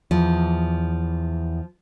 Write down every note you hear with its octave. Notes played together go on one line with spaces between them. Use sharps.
E2 F3